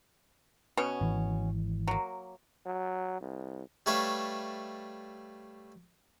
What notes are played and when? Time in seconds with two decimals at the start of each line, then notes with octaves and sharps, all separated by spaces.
0.77 B2 B3 C#4
1.01 G#1 E3
1.87 F#3 A#3
2.66 F#3
3.21 C2
3.86 G3 A3 B4 C#5 E5 F5